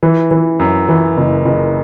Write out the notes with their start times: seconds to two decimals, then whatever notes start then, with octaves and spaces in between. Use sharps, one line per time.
0.03 E3
0.31 E3
0.59 F#2
0.89 E3
1.18 F#1
1.46 F#1